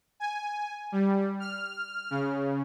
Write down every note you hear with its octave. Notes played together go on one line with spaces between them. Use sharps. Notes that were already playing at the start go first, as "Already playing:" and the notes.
G#5
G3
F6
C#3